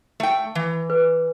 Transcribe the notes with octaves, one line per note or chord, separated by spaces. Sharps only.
A3 G5
E3
B4